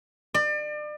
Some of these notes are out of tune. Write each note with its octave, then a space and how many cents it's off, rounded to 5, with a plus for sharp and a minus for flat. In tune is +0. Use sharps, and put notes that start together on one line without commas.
D5 +35